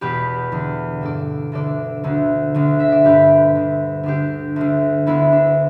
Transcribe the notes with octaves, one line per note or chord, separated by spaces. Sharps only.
E2 B2 G4 B4
E2 D3
G2 D3 A4 D5
D2 D3 A4 D5
D2 D3
D2 D3
E5
D5
G2 D3 G4 B4
D2 D3
D2 D3 D4 G4
D2 D3
D2 D3 B3 E4
D4